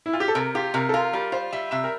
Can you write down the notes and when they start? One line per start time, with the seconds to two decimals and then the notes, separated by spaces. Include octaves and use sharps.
0.06 E4
0.13 F4
0.20 G4
0.28 A4
0.35 C3 A#4
0.55 F4 G4
0.74 C3 A#4
0.89 A4
0.94 F4 A#4
1.13 G3 A#4
1.32 F4 C5
1.52 G3 E5
1.71 C3 E5
1.84 A#4